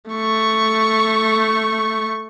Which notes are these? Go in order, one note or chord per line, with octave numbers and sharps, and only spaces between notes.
A3 C#6